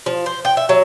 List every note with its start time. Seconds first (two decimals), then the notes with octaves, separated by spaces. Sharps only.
0.06 F3
0.26 C5
0.45 G5
0.57 E5
0.69 F#3